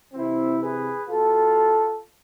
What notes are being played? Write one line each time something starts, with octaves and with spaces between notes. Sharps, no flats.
C3 E3 C4 E4
G#4 B4
B2 F4 A4